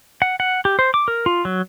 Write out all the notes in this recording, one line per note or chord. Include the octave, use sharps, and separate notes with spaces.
F#5
F#5
G4
C5
D6
A#4
F4
F#3